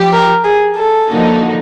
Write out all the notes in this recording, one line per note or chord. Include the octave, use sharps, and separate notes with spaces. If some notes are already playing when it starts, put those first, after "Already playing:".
Already playing: F3 G4
A#4
G#4
A4
D3 F3 A#3 D#4 F#4